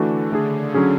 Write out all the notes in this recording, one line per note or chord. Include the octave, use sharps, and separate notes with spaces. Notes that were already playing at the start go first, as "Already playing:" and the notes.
Already playing: D3 E3 A3 D4 F#4
C#3 A3 D4 G#4
D3 F#3 C#4 G#4